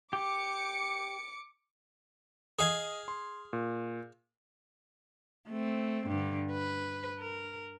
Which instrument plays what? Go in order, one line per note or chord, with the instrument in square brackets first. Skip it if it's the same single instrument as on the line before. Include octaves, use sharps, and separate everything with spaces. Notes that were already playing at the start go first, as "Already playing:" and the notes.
[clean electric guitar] G4 [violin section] D6 C#7
[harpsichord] G#4 F5 G#5 [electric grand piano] D#5 D#6
[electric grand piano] C6
A#2
[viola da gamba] A3 C4
G2 D3
B4
A#4